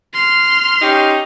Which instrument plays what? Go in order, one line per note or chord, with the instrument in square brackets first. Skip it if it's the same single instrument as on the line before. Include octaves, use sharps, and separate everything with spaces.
[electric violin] C6 F6
[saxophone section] C#4 D#4 G4